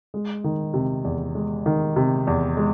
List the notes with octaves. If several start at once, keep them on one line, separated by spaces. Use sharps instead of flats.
G#3
D#3
C3
E2
G#3
D#3
C3
E2
G#3